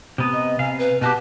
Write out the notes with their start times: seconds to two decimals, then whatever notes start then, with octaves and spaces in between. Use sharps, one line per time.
0.18 C3 B3
0.33 D#5
0.59 C3 F5 G#5
0.79 B4
1.01 B2 F#4 G4 A5